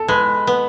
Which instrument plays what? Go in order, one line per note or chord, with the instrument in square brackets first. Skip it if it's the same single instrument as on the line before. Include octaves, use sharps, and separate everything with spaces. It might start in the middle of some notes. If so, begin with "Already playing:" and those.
Already playing: [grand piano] A4
[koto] G#3 [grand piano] B4
[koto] B3